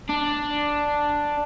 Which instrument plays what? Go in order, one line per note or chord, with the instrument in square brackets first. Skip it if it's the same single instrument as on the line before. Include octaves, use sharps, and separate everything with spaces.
[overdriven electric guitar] D4